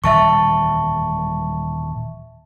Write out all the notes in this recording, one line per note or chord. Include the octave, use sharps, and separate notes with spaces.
D#1 E3 G3 E5 A5 C#6